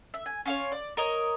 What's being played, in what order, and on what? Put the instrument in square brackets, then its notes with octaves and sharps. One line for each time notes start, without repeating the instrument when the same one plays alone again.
[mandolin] E5
G#5
C#4 F4 C#5
D5
A#4 C#5 D#5